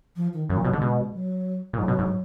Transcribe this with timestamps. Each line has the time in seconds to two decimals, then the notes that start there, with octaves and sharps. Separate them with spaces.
0.16 F3
0.33 D#3
0.49 F#2 D#3
0.57 A#2 F3
0.65 B2 F#3
0.73 D3 G#3
0.82 B2
1.14 F#3
1.73 A#2
1.78 G#2 F#3
1.88 B2
1.99 G#2